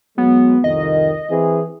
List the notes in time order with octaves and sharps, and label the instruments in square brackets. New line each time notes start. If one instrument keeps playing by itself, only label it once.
[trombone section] F#3 G#3 [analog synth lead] B3
[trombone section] C2 F2 D#3 [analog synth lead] D#5
[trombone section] E3 C4 G#4